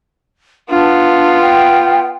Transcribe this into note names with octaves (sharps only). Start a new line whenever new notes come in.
B3 D4 F4
G5